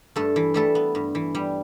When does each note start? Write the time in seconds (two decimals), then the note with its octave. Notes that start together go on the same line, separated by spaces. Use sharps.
0.16 G2 A3 A4
0.36 E3
0.54 G3 A3 A4
0.75 B3
0.95 G2
1.15 E3
1.35 G3